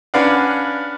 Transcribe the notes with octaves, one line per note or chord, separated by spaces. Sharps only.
C#4 D4 B4 D5 F5 F#5